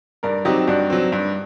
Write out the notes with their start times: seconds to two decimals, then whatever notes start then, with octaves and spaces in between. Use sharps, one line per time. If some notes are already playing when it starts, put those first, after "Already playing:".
0.23 G2 A#4 D5
0.45 F#3 C4 D#4 G4
0.67 G2 D4 F#4
0.90 F#3 C4
1.12 G2